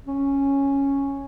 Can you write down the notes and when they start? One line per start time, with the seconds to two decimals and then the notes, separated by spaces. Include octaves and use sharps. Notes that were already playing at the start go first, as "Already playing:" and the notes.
0.07 C#4